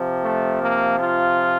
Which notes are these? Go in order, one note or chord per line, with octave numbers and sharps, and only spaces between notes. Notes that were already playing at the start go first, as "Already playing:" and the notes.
Already playing: C3 F3
A3
A#3
F4